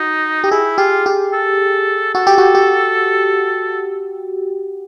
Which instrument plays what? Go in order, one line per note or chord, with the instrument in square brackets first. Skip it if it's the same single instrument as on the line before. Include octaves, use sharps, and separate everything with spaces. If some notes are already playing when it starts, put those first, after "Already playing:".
Already playing: [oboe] D#4 [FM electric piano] F#4
[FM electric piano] G4
[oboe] E4 [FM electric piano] G#4
[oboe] F4 [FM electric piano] G4
[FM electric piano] G4
[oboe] A4
[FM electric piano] F#4 [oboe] A4
[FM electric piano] G4
F#4
G4